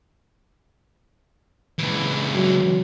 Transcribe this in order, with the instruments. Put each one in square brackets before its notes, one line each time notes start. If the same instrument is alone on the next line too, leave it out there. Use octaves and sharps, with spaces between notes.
[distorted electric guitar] C#2 E3
[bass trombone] F#3